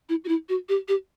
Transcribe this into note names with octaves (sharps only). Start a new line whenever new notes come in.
E4
F#4
E4
F#4
G4
G4